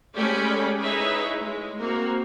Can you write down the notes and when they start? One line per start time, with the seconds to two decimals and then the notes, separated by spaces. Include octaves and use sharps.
0.16 G#3 A3 C#4 G4 D5 B5
0.81 D#4 E4 G#4 B4 C#5 E5
1.42 G#3
1.77 A#3 C4 F#4